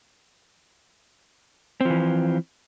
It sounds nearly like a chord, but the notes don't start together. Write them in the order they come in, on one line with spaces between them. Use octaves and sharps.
C4 F3 E3